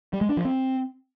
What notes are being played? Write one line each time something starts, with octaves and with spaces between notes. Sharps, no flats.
G3
G#3
D4
F3
C4